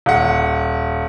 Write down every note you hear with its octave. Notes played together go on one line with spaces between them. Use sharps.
D#1 F#5